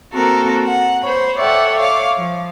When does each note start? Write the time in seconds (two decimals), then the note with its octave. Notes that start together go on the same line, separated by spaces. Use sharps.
0.12 A#3 C4 F#4 A4 A#4
0.66 F#5
1.03 C5 C#5 B5
1.37 A4 C#5 D5 E5 F#5 G5
1.78 C#5 F5 D6
2.15 F3